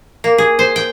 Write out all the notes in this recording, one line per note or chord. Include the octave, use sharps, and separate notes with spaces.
A#3
G#4
C5
G5